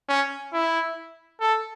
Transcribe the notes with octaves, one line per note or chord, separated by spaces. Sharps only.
C#4
E4
A4